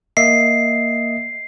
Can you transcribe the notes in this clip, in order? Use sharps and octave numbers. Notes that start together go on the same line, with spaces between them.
A#3 D#5 E5 C7